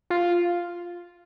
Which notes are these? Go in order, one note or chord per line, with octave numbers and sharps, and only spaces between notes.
F4